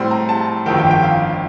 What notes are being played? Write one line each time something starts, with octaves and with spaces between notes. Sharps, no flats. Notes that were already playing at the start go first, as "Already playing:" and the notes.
Already playing: A2 G3 C4 C6
A#5
A5
G1 F2 D#3 G5
G5
G5
F5